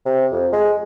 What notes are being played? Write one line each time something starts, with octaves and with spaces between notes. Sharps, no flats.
C3
F2
G#3